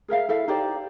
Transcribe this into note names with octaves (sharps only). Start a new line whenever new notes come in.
G#4 A#4 E5 F5
E4 A4 E5 F5
D#4 G4 C5 D5